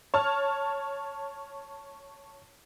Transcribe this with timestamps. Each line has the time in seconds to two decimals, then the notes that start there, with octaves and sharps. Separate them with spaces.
0.14 C#5 A5 F6